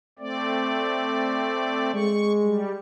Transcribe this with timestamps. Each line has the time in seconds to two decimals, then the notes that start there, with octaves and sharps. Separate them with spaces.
0.19 A3 C4 D5
1.94 G#3 C#6
2.41 G3